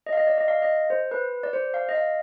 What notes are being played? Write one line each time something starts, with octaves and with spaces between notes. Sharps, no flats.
D#5
F5
D#5
D5
D#5
F5
D#5
C5
B4
D5
C5
F5
D#5
F5